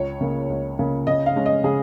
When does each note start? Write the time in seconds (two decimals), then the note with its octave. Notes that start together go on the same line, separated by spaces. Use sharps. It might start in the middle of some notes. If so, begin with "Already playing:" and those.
Already playing: C#2 C#5
0.21 C#3 A#3
0.49 C#2
0.79 C#3 A#3
1.07 C#3 D#5
1.26 F5
1.36 G#3 C#4
1.46 D#5
1.64 C#3 G#4